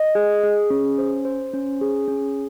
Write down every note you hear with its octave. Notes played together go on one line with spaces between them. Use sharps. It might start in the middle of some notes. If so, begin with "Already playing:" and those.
Already playing: D#5
G#4
G#4
C#4
C5
C5
C#4
G#4
C#4